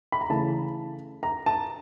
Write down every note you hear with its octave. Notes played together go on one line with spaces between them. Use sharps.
B5
A#5
C#3 E3 A3 A5
A#5
A5